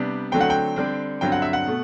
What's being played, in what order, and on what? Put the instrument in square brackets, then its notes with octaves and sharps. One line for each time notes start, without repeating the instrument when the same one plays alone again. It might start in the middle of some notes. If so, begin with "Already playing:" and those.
Already playing: [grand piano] C3 G3 B3 D4
D3 F#3 A3 C4 G5
F#5
G5
D3 G3 C4
G2 D3 F#3 C4 G5
F#5
E5
F#5
B2 A3